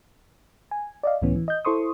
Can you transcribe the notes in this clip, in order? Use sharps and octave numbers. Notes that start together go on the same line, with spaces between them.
G#5
D5 D#5 F5
C#2 A2 E3 B3 C#4
E3
D#5 G6
E4 A4 C5 C6 C#6 D#6